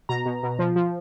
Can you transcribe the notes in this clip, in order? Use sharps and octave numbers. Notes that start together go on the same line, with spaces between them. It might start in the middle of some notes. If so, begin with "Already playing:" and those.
B2 A#5
B2
B2
F3
F3